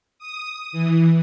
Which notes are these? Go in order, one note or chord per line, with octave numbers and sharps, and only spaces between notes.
D#6
E3